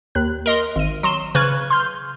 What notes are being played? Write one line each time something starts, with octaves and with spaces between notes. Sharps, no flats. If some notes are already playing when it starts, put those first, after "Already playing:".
D#2 F#6
A#4 D#5 C6
G#1 D#7
F#3 C6 E7
C#3 B4 C#6 F6 G#6
C6 F6 G6